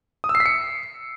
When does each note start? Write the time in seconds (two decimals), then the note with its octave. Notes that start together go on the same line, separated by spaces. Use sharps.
0.24 D#6
0.29 E6
0.35 C7
0.40 B6
0.46 C#7